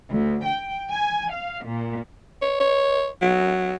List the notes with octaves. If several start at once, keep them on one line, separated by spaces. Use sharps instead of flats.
D2
G5
G#5
F5
A#2
C#5
C#5
F#3